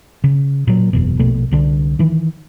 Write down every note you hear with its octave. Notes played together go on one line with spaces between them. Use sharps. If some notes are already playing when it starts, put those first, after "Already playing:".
C#3
A#2 F#3
F#1 E2 B2
A#1 B2 A3
C2 D3 D4
D#3 E3